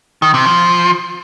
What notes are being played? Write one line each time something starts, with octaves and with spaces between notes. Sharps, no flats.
D#3
C3
F3